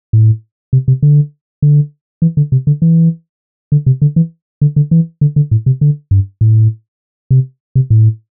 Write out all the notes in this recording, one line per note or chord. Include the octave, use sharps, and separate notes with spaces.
A2
C3
C3
D3
D3
E3
D3
C3
D3
E3
D3
C3
D3
E3
D3
D3
E3
D3
D3
A2
C3
D3
G2
A2
C3
C3
A2